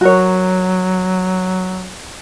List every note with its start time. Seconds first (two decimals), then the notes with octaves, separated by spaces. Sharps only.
0.01 F#3 F#4 A#4 C#5